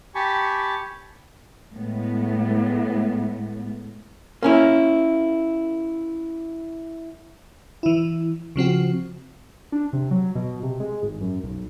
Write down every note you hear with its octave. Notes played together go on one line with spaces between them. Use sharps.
G4 G#5 A5 B5 C#6
A2 G#3 B3
A#3 C#4 E4
E3 E4
C#3 F3 C4 F#4
D4
C3
F#3
B2
C3
G#3
G#1
F#2
B1